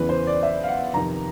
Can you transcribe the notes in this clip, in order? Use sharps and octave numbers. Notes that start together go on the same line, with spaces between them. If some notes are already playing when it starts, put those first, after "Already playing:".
Already playing: E2 C#3 E3 B4
C5
D5
E5
F5
F#5
F2 C3 D#3 A#5